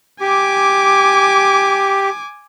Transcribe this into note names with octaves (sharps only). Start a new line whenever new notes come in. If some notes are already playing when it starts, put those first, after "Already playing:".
G4 G#5 D6